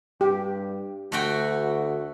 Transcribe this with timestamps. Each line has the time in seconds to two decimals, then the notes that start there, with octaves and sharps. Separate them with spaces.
0.21 G2 G4
1.12 D2 A3 F#4 G5